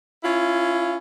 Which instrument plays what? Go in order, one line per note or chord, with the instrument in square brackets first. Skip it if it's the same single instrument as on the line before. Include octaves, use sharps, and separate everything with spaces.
[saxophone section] C#4 E4 F4